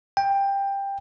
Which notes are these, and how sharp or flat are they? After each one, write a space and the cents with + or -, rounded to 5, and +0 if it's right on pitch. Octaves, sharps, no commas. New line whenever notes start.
G5 +15